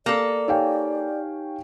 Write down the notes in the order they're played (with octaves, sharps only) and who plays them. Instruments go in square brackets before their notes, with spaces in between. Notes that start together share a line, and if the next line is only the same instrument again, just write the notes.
[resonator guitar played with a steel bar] A#3 A4 [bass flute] D5
[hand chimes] D#4 G4 G#5 [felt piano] C#5 F5 G5